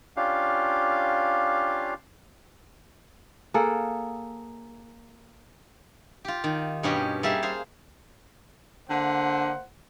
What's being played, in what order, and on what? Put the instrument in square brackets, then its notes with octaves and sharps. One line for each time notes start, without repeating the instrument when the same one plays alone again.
[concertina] C#4 D4 F4 G4 F5
[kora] A#3 G#4 A4 F#5
[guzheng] F4 G4
D#3
G2 B2 C#4 G4 D#5
G3 A#3 G#4 E5 F5
G#4 C5 F5
[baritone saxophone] D3 [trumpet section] A#3 C5 F#5